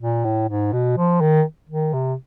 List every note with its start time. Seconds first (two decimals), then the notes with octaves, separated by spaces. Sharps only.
0.01 A#2
0.24 A2
0.48 G#2
0.73 B2
0.97 F3
1.21 D#3
1.70 D#3
1.94 C3